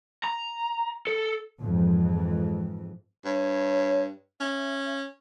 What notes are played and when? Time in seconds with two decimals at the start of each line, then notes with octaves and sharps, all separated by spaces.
0.24 A#5
1.07 A4
1.60 F2 G#2 E3
3.25 G2 C#5
4.40 C#4 E5